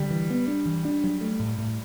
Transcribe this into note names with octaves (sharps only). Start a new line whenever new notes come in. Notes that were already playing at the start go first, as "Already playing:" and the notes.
Already playing: D3 G3
E3
B3
D4
E3
D4
F#3
A3
A2
A2